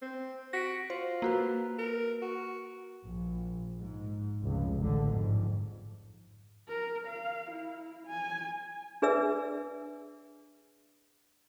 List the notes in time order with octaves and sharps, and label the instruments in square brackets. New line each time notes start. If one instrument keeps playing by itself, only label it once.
[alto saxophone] C4
[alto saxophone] F#4 [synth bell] A#6 B6 D7
[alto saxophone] F4 [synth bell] C5
[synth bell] A#3 F#4 B4
[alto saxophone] A#4
F#4
[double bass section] A#1
G#2
F1 C#2
A1 D3
F2 G#2
[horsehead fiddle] A#4
F5
E4
G#5
[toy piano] D4 G#4 B4 D5 E5 E6